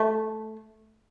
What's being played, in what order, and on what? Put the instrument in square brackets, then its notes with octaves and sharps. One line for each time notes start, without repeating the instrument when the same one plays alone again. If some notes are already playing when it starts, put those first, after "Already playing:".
Already playing: [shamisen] A3